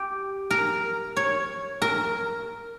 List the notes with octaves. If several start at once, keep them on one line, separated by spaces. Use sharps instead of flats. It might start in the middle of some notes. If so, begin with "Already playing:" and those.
Already playing: G4
A#4
C#5
A#4